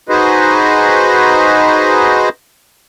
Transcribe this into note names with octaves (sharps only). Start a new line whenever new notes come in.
D#4 F#4 G#4 B4 C5 D#5